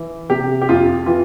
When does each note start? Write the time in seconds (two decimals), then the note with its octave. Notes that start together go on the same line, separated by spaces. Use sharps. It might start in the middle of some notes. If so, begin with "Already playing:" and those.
Already playing: E3
0.30 C3 G4
0.62 G4
0.69 F2 F4
1.06 E3 F4